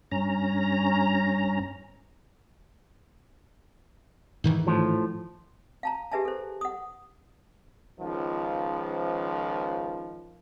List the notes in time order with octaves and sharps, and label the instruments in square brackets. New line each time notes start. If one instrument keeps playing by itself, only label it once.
[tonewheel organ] G2 C#4 A#5
[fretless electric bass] G#2 D#3 E3
[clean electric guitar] A2 F3
[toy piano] F5 A5 A#5
G4 G#4 B4 E5 G#5 A5
A4 C5
F#5 D#6
[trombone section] C#2 D#3 F3